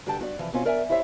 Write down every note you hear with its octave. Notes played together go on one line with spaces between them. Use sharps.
G2 D3 F#4 G4 G5 A5
G2 F#4 A4 D5
C3 E3 F3
B2 C4 C#4 F4
A#4 D5 E5 G#5
E4 G4 C5 C#5 E5